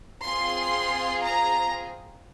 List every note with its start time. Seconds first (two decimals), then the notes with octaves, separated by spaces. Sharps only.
0.25 C4 F4 G#4 C6
1.24 A#5